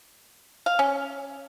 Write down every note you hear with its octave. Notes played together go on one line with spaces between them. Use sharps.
F5
C#4